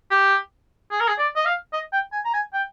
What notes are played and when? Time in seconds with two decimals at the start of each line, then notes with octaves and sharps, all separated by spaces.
0.11 G4
0.91 G#4
1.00 A#4
1.08 G#4
1.19 D5
1.36 D#5
1.45 F5
1.73 D#5
1.93 G5
2.13 G#5
2.25 A#5
2.34 G#5
2.54 G5